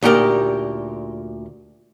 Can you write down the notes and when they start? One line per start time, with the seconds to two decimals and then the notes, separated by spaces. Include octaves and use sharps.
0.03 D2 A#2 D#4 G4 A#4